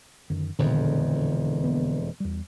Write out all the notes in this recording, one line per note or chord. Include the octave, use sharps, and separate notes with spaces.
F#2 D3 D#3
E1 F2 A#2 D3 D#3
F3 A#3 B3
E2 G3